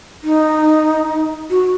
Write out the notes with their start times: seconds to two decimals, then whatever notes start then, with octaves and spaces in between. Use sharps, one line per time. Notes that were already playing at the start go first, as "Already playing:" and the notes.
0.23 D#4
1.50 F#4